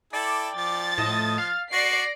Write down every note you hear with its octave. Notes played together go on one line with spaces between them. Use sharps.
E4 A4 D5 G5
F3 A6
A2 D#5 A5 D#6
F5 F6
F#4 D5 A#6 C7 D7